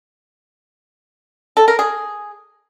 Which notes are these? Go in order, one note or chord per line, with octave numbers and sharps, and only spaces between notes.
A4
A#4
G#4